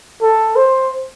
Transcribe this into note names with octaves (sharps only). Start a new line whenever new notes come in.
A4
C5